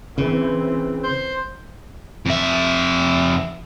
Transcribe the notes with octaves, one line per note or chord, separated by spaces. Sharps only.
C#3 E3 C4
C5
F2 E5